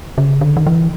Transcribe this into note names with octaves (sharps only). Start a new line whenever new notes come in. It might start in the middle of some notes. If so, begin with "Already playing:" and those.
C#3
D3
D#3
E3